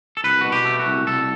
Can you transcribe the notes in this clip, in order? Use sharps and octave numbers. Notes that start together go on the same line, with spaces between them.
A4
C2 B4
B2 F#4
G4
A3
F#4
C2
C2 A4